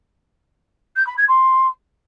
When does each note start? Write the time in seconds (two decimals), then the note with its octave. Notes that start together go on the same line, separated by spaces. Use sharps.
0.96 G6
1.07 B5
1.17 G#6
1.28 C6